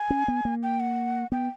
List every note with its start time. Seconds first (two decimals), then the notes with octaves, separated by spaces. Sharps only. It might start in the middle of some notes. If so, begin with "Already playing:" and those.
Already playing: G#5
0.10 C#4
0.28 B3
0.45 A#3
0.63 G5
0.80 F#5
1.32 B3 G5